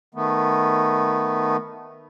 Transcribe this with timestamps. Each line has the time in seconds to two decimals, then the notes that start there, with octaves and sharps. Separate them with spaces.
0.14 D#3 A3 B3